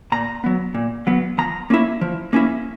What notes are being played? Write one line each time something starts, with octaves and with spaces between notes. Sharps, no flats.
A#2 A#5
F#3 B3
A#2
F#3 B3
F3 A#5
A#3 C#4 E4
F3
A#3 C#4 E4